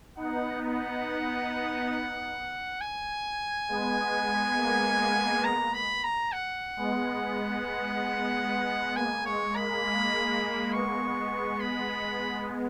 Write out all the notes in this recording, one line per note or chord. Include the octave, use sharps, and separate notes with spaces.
B3 D#4 F#5
B3 D#4 F#5
G#5
G#3 B3
A#3
G#3 B3
A#5
B5
A#5
F#5
G#3 B3
G#3 B3
A#3 G#5
G#3 C#5
A#3 B5
G#3
G#3 B3 C#6
B5